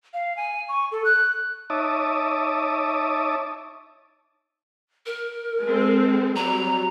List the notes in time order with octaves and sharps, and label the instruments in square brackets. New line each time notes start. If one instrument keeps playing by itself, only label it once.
[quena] F5
G#5
C#6
A4
F#6
[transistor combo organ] D#4 C#5 E5 A5 D6 D#6
[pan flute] A#4
[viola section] G#3 C4 A4
[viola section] F#3 G3 C4 [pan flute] A#5